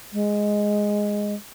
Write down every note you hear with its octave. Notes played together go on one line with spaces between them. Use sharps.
G#3